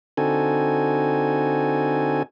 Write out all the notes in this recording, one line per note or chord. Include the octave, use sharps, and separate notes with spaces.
D3 C4 D#4 F#4 A4 G#5